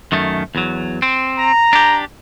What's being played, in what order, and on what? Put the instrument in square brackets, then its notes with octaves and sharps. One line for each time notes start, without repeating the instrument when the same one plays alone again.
[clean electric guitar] F#2 D#3 A3
E2 F#3
C4
[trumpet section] A#5
[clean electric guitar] D4 G4